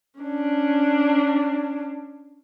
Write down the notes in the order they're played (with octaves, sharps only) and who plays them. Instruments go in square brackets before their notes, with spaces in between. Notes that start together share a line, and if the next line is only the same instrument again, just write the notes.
[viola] C#4 D4